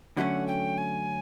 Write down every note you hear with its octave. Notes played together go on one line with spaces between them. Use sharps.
D3 F#3 A3 C#4 F#5
G5
G#5